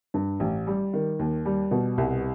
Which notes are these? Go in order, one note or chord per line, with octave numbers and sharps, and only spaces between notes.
G2
A1
G3
D#3
D#2
G3
B2
C2